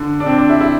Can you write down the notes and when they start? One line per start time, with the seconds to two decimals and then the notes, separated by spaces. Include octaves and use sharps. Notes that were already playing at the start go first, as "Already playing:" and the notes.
Already playing: D3
0.20 D4
0.26 C4
0.38 D4
0.50 E4
0.61 E4